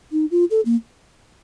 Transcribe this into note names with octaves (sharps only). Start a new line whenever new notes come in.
D#4
F4
A4
A#3